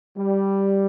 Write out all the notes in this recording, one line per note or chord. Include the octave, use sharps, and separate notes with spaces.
G3